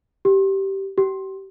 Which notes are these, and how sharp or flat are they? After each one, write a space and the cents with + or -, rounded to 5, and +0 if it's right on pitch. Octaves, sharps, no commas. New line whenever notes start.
G4 -15
G4 -35